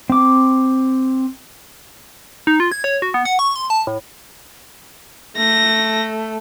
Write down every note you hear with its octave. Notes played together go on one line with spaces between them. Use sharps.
C4 D6
D#4
F4
G#6
C#5
F#4
B3
F#5
C#6
C6
A5
A2
A3 A#6